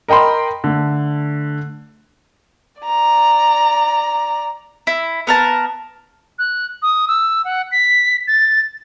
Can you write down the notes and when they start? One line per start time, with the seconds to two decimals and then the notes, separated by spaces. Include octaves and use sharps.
0.08 A#4 D#5 G5 B5 C6
0.64 D3 A3
2.82 D5 A#5
4.87 E4
5.27 B3 A#4 A5
6.39 F#6
6.82 D#6
7.08 E6
7.45 F#5
7.72 B6
8.28 A6